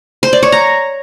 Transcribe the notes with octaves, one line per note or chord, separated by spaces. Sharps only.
C5
D5
C#5
A#5